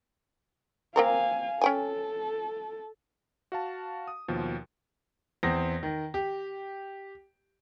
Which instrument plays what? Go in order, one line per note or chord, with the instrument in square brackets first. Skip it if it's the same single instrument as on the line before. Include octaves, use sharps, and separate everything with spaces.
[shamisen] A#3 C4 A#4 [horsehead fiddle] F5 G#5
[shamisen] C#4 G5 G#5 [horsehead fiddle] A4
[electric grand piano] F#4 F5 A5
D#6
D#2 B2 F3
[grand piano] E2 C4 A#6
D#3
G4